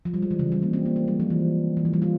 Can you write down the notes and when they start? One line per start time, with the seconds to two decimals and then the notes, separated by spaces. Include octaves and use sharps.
0.05 F3
0.14 G3
0.22 G#3
0.31 E3
0.39 C#3
0.52 G3
0.62 A#3
0.73 C4
0.85 A#3
0.96 G#3
1.08 G3
1.20 F3
1.30 E3
1.77 E3
1.85 F3
1.93 G3
2.02 F4